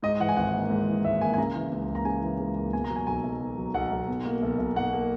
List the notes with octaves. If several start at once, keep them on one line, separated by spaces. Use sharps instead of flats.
G#2 D#5
E3 F#5
G#5
G#1 F#5
A#3
G#2
E3
G#1 E5
A#3 G#5
G#5
C#3 A#5
E3
C#2
A#3
A#5
C#3 G#5
E3
C#2
A#3
B2 G#5
A#5
F#3
G#5
B1 G#5
B1
B2
F#3
B1 F#5
B1
B2
A#3
B1
B1
B2 F#5
A#3